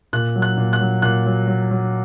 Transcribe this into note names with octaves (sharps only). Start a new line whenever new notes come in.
A#2 F#6
F#3
F#6
A#2
F#6
F#3
A#2 F#6
F#3
F#3
F#3